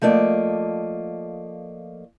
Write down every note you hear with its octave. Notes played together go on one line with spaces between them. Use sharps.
F3 A3 A#3 D5 D#5